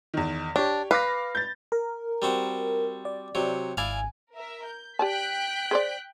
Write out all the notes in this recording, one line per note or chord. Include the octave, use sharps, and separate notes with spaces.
E2 D#3
D4 G4 C#5
B4 F5 D6 A#6
G6 A6
A#4
G3 C4 F#4
D5
C3 F#3
G#1 E4 D5 F5 G#5
A#4 E5
G6
G4 D5 G5 A5 F#6 B6
G#4 C5 D5